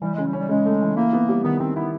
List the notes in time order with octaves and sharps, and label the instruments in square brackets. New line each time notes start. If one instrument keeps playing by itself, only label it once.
[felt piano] E3 [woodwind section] G3
[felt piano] C#3 [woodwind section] G#3
[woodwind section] G3
[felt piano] C#4
[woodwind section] G3
[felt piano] C#3 [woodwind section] G#3
[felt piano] A3
E3
[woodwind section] A#3 [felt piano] E4
[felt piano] B3
G3
[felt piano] D#3 [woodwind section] B3
[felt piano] D#3 [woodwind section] C4
[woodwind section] B3 [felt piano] E4